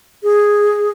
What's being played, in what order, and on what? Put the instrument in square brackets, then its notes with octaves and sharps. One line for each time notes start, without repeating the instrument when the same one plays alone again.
[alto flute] G#4